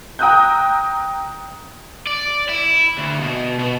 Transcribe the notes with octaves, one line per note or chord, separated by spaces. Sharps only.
G5 A#5 D#6 E6 F#6 G6
D5
E4
D2
B2
B2